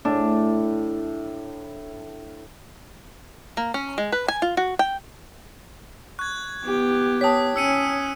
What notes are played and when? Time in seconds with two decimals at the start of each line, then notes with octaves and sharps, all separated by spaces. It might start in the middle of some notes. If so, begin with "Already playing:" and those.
0.05 A2 D4
3.57 A#3
3.74 C#4
3.98 G#3
4.12 B4
4.28 G#5
4.42 F4
4.57 F#4
4.79 G5
6.19 C#6 F#6 G#6
6.64 B3 G4
7.21 C#5 G5 A5 D#6 B6
7.56 C#4 E6 C#7 D#7